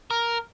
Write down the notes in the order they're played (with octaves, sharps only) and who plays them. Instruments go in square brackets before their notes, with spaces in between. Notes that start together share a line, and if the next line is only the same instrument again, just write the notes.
[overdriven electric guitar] A#4